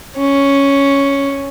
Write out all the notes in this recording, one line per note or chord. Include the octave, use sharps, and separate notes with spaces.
C#4